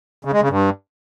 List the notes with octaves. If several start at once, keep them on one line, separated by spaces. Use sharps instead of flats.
C#3
G#3
C#3
G2